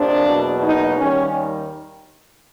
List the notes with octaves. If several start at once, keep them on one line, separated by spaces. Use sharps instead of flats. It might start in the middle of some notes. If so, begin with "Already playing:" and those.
Already playing: F2 C3 F3 A#3 D4
E2 B2 F#3 A#3
D#4
D#2 D#3 G3 C#4